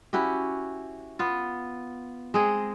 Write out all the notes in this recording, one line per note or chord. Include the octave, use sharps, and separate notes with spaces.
C#4 E4 F#4 G4
B3 F4
G#3 C4 G#4 D#5